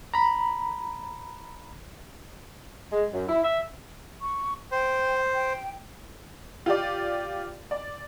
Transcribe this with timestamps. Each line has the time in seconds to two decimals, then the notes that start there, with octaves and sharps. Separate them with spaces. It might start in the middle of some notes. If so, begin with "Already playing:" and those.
0.14 A#5 B5
2.93 G#3
3.12 F#2
3.29 E4
3.43 E5
4.21 C#6
4.72 C5 G5
5.34 G5
6.66 F4 G4 D5
7.71 D5